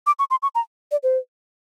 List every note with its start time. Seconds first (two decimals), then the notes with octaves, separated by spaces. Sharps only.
0.07 D6
0.19 C#6
0.31 C6
0.43 C#6
0.55 A#5
0.92 D5
1.03 C5